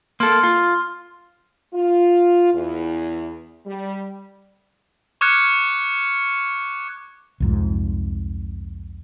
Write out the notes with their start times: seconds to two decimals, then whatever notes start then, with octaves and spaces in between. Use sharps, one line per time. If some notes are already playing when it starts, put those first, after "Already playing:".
0.20 A#3 A4 C6 F6
0.43 F4
1.74 F4
2.54 E2
3.66 G3
5.21 C#6 D6 F6 F#6 G#6 C#7
7.40 C2 F2 G#2